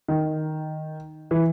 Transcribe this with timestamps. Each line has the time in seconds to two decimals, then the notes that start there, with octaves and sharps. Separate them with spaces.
0.08 D#3
1.31 E3